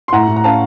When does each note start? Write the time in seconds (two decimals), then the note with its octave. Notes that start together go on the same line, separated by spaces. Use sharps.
0.08 C6
0.12 A2 F#5 A#5
0.28 A2
0.36 A#5
0.44 C#4 F5 A5